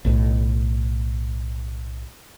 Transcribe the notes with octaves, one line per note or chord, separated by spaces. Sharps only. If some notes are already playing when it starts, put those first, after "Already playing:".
B1 A2